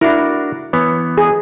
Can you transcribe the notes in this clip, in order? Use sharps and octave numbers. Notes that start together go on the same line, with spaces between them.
D4 E4 F#4 A#4
E3 B3 C#5
G#4